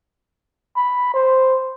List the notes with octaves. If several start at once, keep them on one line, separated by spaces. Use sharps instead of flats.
B5
C5